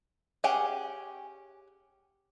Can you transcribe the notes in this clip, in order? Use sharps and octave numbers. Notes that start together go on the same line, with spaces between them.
C#4 G4 G#4 F#5 G#5